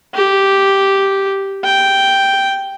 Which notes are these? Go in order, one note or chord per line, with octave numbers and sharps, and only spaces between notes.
G4
G5